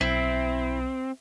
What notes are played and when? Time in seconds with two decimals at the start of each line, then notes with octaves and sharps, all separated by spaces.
0.01 B1 C4 E4